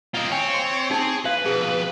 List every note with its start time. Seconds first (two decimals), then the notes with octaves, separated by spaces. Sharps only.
0.14 A#3 C4 F4 D#5
0.32 C4 C#5 G5 G#5
0.54 C6
0.91 D#4 G#4 G#5 A5
1.25 B4 F5
1.45 F2 B2 G#4